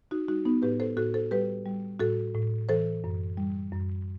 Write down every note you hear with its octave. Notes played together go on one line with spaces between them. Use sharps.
D#4 F#4
G3 D#4 F#4
B3 D#4
A2 G4 B4
A4 C5
A2 F#4 A4
A4 C5
G3 G4 B4
G3
A2 F#4 A4
A2
E3 A4 C5
F#2
G3
F#2